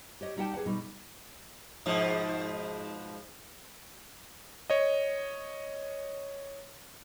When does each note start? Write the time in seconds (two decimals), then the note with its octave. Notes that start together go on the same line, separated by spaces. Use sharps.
0.21 G4 C#5 D#5
0.37 G3 D#4 G4 F#5 G5 A5
0.53 G#4 B4 D5 F#5
0.66 B2 G3 D#4
1.86 G#2 B2 F3
4.70 C#5 D#5